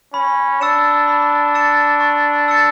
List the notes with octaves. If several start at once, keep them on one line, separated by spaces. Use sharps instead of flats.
C#4 B5
D4 E6 A6 C#7 E7
B5
E6 A6 C#7 E7
C#6
E6 A6 C#7